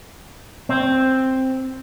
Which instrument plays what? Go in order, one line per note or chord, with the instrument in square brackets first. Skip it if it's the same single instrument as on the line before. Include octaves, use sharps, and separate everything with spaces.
[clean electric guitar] C4